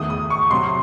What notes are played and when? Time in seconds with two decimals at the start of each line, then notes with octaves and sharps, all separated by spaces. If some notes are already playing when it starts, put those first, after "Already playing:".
Already playing: E2 D#3 A3 D#6
0.10 D#6
0.30 C#6
0.51 C2 C3 F#3 C6